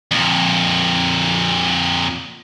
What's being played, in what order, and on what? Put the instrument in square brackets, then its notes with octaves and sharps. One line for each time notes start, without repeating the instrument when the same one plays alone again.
[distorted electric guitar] F2 A#2